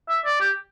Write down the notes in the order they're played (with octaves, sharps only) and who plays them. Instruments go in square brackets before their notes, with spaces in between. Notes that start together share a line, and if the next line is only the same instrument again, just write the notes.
[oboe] E5
D5
G4